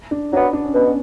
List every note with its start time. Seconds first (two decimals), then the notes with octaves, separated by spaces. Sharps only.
0.11 D4
0.32 F#3 D4
0.35 B3
0.53 D4
0.64 C#4
0.74 B2 B3
0.86 C#4